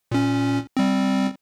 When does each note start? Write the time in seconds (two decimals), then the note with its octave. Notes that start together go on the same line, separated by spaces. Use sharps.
0.12 A#2 C#4
0.77 G3 C4